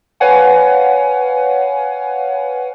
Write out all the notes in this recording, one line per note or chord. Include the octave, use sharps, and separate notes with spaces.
B4 C#5 F5 F#5 G#5